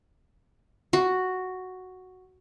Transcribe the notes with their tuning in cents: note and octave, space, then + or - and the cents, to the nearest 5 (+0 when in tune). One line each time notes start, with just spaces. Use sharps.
F#4 +0